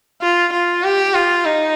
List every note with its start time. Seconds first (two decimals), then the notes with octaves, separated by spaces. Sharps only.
0.22 F4
0.53 F4
0.84 G4
1.14 F4
1.46 D#4